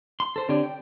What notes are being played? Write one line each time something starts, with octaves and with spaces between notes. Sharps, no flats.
C6
A4 C5
D3 C4 G4 C#5 D5
G5